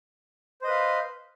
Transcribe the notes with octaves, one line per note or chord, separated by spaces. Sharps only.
B4 C5 D#5 F5